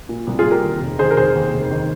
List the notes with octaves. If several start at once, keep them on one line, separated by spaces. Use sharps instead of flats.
A#2
C2
F4 G#4
C2
G4 A#4
D#2
F1
D#3 G#4 C5
A#4
F1 G#4 C5
D#2
F1
D#3